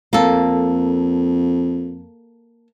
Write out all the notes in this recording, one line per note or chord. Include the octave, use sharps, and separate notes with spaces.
F2 A#3 A4